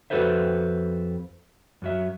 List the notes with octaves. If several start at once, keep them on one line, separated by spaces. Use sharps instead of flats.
F2 F#4 A4 B4 C5 E5
F#2 F#3 E5